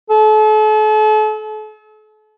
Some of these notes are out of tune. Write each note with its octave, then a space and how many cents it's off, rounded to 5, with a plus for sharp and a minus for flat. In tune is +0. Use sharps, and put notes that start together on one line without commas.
A4 -40